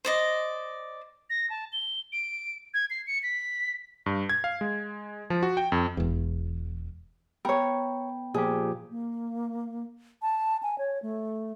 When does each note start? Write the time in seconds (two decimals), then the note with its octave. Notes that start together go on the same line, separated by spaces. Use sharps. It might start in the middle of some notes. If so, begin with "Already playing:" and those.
0.05 C5 D5 D#5
1.30 A#6
1.50 A5
1.73 G7
2.12 D7
2.74 G#6
2.90 C7
3.07 C#7
3.23 B6
4.06 G2
4.29 G#6
4.44 F5
4.61 G#3
5.30 F3
5.43 F#4
5.57 G5
5.72 F2
5.97 E1 E2
7.45 B3 A#4 C#5 G5 B5
8.34 A#2 F3 G4 G#4
8.91 A#3
10.22 A5
10.63 G#5
10.78 C#5
11.02 A3